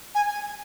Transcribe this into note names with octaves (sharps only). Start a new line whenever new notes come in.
G#5